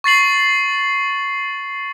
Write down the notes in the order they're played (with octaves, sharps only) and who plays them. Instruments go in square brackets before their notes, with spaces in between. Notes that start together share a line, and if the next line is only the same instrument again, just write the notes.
[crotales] C#6 A6 C7 F#7